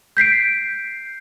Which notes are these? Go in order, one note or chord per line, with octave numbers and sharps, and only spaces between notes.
G6 B6 C7 D7